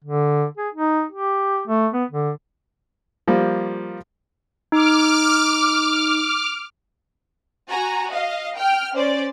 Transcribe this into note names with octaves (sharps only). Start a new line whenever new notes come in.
D3
G#4
D#4
G4
A3
B3
D3
F3 G3 A#3
D#4 D6 F6
F#4 G#5 A#5
D#5 F5
G5 F6
C#4 C5 D5